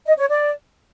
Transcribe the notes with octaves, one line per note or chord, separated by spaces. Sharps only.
D#5
C#5
D5